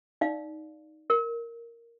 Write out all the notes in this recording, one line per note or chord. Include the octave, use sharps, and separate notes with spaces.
D#4 D5 F5
A#4